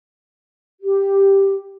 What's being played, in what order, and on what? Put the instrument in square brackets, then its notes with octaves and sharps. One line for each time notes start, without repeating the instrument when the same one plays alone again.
[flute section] G4